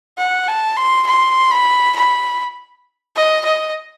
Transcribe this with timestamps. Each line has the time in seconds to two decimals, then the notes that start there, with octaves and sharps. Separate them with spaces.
0.17 F#5
0.48 A5
0.76 C6
1.06 C6
1.51 B5
1.96 B5
3.16 D#5
3.45 D#5